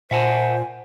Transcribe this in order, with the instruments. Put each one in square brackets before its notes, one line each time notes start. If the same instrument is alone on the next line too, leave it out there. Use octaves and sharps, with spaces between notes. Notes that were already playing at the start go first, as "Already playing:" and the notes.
[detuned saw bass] A#2 [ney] C5 [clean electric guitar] E5 F#5 A5 [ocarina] G#5